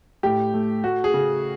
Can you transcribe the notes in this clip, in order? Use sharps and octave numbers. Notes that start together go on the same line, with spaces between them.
A2 G4
A3
A3 F#4
G#4
C#3